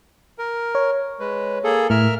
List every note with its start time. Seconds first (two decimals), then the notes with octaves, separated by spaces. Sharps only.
0.38 A#4
0.75 C#5
1.20 G#3 B4
1.64 A#3 G#4 A4
1.90 A2 A#4 E5 F6